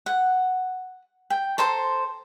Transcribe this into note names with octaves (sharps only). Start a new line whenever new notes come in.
F#5
G5
A4 C5 A#5 C6